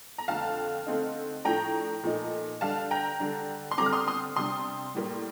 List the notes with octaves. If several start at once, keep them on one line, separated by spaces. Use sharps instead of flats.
A#5
F2 D3 A3 F5 A5
D3 A3 C4 D#4
A2 F3 A3 D4 G5 A#5
A#2 F3 A3 D#4
D3 G3 D4 F5 A5
G5 A#5
D3 G3 D4
C6
D3 G3 C4 A#5 D6
F6
C6 D#6
C6 D#6
C3 G3 D4 C6 D#6
A2 G3 A#3